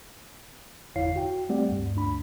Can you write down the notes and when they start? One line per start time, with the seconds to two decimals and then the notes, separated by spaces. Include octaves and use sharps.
0.96 G1 E2 E4 C#5 F5 C7
1.16 F#4 G5
1.49 G3 A3 C4 G4 D5 F#5
1.69 D2 G2
1.96 D2 D4 B5